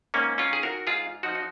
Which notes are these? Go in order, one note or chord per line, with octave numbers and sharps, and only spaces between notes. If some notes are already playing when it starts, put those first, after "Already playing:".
G#2 A#3 C#4
C#4 F4
D#3 G#4
F#4 A#4
G#2 F4 G#4
F3 D#4 F#4
D#4